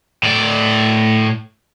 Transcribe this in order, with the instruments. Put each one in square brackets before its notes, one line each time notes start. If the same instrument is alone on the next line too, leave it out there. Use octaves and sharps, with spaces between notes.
[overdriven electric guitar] A2 D5